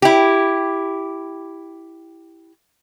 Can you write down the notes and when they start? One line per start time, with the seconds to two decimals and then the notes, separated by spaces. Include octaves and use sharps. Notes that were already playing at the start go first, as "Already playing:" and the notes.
0.02 E4 G4